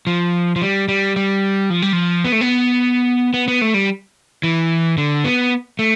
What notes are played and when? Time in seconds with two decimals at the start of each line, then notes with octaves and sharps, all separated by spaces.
0.07 F3
0.56 F3
0.62 G3
0.88 G3
1.16 G3
1.70 F3
1.82 G3
1.93 F3
2.25 B3
2.32 A3
2.41 B3
3.34 B3
3.48 B3
3.62 A3
3.74 G3
4.43 E3
4.98 D3
5.24 B3
5.79 A3